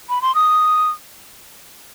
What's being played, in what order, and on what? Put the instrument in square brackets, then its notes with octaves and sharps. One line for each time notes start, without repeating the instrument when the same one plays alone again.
[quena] B5
C6
D#6